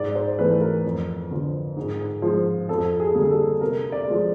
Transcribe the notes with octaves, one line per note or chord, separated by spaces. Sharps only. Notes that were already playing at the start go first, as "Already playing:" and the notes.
Already playing: G#2 D5
C5
E3 A3 B4
A#4
F2
D3 F3
G#2
F3 G#3
F2 A4
G#4
D3 G3 A#3
A4
C3 A#4
D5
F3 G#3